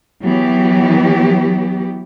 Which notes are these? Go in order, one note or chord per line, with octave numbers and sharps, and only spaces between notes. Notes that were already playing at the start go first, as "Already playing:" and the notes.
E3 F#3 B3 G4